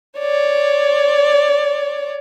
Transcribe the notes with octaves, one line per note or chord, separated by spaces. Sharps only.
C#5 D5